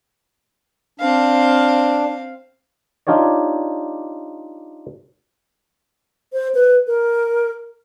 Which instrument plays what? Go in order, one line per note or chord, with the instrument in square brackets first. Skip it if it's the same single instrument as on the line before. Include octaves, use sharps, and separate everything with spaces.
[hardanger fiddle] C4 F5 [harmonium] D4
[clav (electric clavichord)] D4 D#4 F4 G4 C#5 D5
[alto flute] C5
B4
A#4